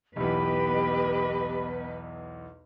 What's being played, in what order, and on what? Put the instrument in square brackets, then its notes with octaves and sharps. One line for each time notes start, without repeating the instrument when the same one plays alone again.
[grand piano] B1 E2 [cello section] B3 B4 D#5 [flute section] G4 B5